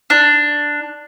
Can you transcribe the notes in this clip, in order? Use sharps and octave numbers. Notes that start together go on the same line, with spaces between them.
D4